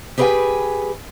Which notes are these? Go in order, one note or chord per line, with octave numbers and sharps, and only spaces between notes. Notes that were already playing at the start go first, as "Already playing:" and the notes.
G4 G#4 B4 D#5 G5 G#5